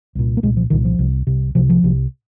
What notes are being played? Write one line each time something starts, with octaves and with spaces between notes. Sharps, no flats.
C2 A#2
A#3
C2 A#2 G#3
F3
C2 A#2 D#3
F3
C2 C3
C2 C3
C2 C3 F3
F3
C2 C3